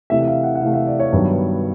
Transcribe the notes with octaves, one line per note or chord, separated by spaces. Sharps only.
C3 E3 A3 E5
E5
F5
F#5
F#5
C3 E3 A3 F5
E5
D5
C#5
G2 D#3 F#3 B3